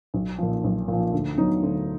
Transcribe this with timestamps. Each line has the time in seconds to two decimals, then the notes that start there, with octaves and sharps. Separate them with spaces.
0.14 B1
0.38 A#2 F3
0.64 B1
0.88 A#2 F3
1.13 D2
1.37 D3 F#3 B3 D#4
1.63 D2